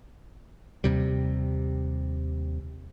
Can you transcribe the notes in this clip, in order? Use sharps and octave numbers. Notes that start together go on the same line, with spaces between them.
D#2 C3 G3